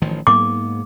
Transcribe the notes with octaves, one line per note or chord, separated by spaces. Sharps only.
A1 D#3 F3
G#2 A#3 B3 D6